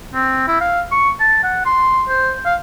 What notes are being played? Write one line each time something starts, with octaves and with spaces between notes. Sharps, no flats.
C4
E4
F5
C#6
A5
F#5
C6
C5
F5